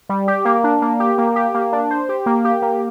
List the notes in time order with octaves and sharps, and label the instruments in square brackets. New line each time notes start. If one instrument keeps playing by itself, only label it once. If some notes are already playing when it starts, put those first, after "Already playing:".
[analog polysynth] G3
G4
A#3
D4
A#3
G4
A#3
G4
A#3
D4
C5
G4
A#3
G4
A#3